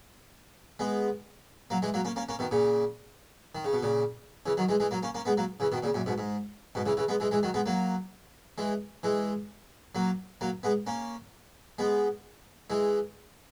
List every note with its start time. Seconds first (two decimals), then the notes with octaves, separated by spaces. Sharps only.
0.79 G#3 B3
1.70 F#3 A#3
1.82 E3 G#3
1.94 F#3 A#3
2.05 A#3 C#4
2.16 A#3 C#4
2.29 A#3 C#4
2.39 B2 D#3
2.51 A#2 C#3
3.55 D#3
3.64 C#3
3.73 B2
3.83 A#2 C#3
4.46 C#3 E3
4.57 D#3 F#3
4.69 E3 G#3
4.80 E3 G#3
4.91 F#3 A#3
5.03 A#3 C#4
5.15 A#3 C#4
5.25 G#3 B3
5.37 F#3 A#3
5.60 C#3 E3
5.72 B2 D#3
5.83 A#2 C#3
5.94 F#2 A#2
6.06 G#2 B2
6.18 G#2
6.75 G#2 B2
6.86 C#3 E3
6.97 C#3 E3
7.08 G#3 B3
7.20 E3 G#3
7.31 E3 G#3
7.43 D#3 F#3
7.54 G#3 B3
7.66 F#3 A#3
8.58 E3 G#3
9.03 E3 G#3
9.95 F#3 A#3
10.41 F#3 A#3
10.63 G#3 B3
10.87 A#3 C#4
11.79 G#3 B3
12.70 E3 G#3